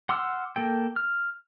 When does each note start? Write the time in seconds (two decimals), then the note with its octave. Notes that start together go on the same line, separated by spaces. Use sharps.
0.09 F#5 C6 D6 E6 F6
0.56 A#3 A4 G5
0.96 F6